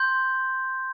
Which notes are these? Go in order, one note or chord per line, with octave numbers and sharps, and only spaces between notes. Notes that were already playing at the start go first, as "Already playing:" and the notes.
Already playing: C6 G6